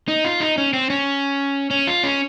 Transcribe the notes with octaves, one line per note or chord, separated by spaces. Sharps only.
D#4
F4
D#4
C#4
C4
C#4
C#4
F4
C#4